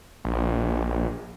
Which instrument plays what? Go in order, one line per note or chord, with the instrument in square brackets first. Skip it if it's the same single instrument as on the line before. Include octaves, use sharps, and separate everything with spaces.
[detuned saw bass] A#1